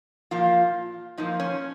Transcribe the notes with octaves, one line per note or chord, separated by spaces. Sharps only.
A#2 F3 A#3 F4
A#2 F3 A#3 D#4
C#4